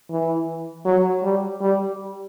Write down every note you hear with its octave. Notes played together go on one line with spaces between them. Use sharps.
E3
F#3
G3
G3